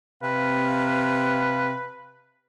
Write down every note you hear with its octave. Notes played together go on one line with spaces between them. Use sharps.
C3 B4 F5